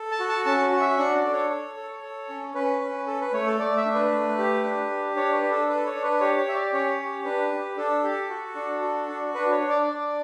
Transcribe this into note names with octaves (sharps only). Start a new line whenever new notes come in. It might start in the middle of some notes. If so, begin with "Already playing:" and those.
Already playing: A4
A5
F#4
A5
C#4 A5
F#4 F#5
E5
D4 F#5
D5
A4
C#5
A4
A4
A4
C#4
C#4 B4
C#4
A4
B4
A3 C#5
A4
A3 D5
E5
D4
B4
A3
G4
D4
G4
D4 C#5
B4
D4
A4
A4 B4
C#5
D4
B4
G4 C#5
C#5
G4 E5
D5
C#4 C#5
G4
D4 B4
G4
D4 A4
G4
F#4
D4
F#4
D4
D4 B4
C#5
D4
D5
D4